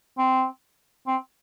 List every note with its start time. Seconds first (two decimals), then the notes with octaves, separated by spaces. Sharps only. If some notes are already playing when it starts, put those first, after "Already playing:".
0.18 C4
1.07 C4